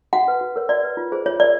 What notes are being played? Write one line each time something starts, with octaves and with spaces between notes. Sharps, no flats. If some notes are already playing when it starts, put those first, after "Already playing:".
F#4 F#5
B4
F#4
A#4 C#5
F#4 D5
B4
F4
G#4 C5
F4 C#5
A#4 C#5 D5